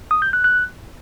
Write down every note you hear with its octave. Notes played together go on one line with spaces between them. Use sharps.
D#6
G6
F#6
F#6